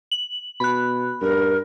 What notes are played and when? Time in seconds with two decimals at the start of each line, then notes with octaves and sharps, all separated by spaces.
0.11 F#7
0.60 B2 B5 F#6
1.22 G2 A#4